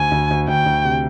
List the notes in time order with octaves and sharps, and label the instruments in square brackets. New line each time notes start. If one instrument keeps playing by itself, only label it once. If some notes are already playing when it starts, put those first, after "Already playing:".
Already playing: [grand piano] D2 [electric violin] G#5
[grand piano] D2
D2
[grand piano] D2 [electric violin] G5
[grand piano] D2
C3